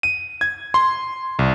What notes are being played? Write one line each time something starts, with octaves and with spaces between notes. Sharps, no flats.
D#7
G#6
C6
C2